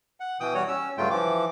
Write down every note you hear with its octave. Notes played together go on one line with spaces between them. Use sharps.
F#5
B2 E3 G5 D#6
G3 F#4 C#5
C#4 E6
G2 C#3 F#3 A3 F4 G5
E3 F3 D6